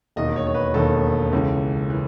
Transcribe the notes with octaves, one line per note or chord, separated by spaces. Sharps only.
E1 D#2 D#3 D#5
C#5
C#5
B4
E1 D#2 D#3 A4
C#2 C#3 E3
E3